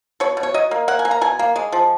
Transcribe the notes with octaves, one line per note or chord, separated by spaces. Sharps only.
B2 C#5
B2
C#5
F#3 D#5
A#3
A#3 F#5
G#5
A#3
A#5
B2 G#5
A#3
G#3
F3